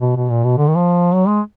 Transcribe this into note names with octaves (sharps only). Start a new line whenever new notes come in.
B2
B2
A#2
B2
D3
D#3
F3
F#3
G#3